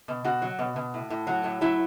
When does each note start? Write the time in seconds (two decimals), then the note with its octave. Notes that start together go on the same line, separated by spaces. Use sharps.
0.08 B2
0.24 B2 F#4
0.42 F#3
0.59 B2
0.76 B2
0.94 A2
1.10 A2
1.27 F#3
1.44 A2
1.61 F#3 E4